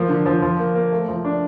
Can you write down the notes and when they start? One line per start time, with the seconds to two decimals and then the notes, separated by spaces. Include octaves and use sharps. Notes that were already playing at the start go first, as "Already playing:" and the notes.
Already playing: F3 A#3
0.09 D3
0.26 F3
0.42 F3
0.59 A#3
0.75 A#3
0.92 A3
1.08 F3
1.25 D4